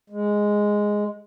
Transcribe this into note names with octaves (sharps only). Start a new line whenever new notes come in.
G#3